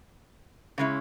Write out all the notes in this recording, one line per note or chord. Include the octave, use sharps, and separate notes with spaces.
C#3 G#3 C#4 E4